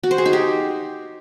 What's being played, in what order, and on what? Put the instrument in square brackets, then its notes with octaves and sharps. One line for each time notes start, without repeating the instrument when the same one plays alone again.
[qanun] F#4
C5
G#4
D#4
G4